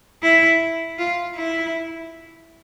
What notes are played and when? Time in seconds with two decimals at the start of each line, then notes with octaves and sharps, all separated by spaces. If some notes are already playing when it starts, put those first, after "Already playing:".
0.22 E4
0.98 F4
1.35 E4